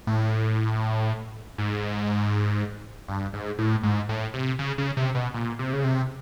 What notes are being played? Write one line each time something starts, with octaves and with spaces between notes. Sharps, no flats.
A2
G#2
G2
G#2
A2
G#2
A2
C3
C#3
C#3
C3
B2
A#2
C3
C#3
C3